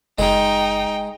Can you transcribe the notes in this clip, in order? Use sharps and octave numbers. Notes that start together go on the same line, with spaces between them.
F#1 G#3 D#4 G#4 G5